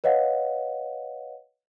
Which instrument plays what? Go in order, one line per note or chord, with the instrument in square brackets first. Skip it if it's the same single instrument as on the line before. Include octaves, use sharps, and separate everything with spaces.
[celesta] B4 C#5 D#5 F5 F#5